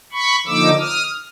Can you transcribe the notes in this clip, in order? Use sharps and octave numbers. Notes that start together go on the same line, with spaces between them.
B5 C#6
D3 F3 A#3 D#4 D6 E6
D#6 F6